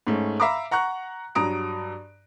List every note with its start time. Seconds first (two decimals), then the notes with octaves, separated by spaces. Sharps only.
0.07 G#2 A3 C#4
0.40 E5 F5 A#5 B5 D6
0.71 F#5 A#5 C#6 F#6
1.35 G2 F#3 A#5 D#6 D7